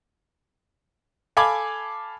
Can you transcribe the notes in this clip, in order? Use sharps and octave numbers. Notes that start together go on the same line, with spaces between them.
A4 F5 G#5 B5 D6 G#6